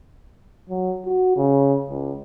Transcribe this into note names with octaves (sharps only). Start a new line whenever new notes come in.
F#3
F#4
C#3
C#2